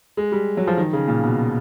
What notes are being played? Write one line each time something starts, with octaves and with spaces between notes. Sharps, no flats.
G#3
G3
F#3
F3
D#3
C#3
A#2
B2